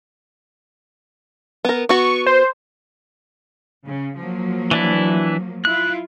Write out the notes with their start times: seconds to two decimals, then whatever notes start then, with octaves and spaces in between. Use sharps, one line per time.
1.65 B3 A#4
1.89 B3 F#4 C#6
2.26 C5
3.86 C#3
4.17 F3 F#3 A#3
4.71 E3 D4 E4
5.65 E4 F4 F#6